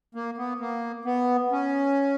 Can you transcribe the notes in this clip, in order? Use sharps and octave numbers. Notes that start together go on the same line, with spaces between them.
A#3
B3
A#3
B3
C#4